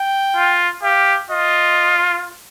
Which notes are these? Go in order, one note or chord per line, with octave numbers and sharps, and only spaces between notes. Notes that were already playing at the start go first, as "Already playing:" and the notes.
Already playing: G5
F4
G4 F5
F4 D#5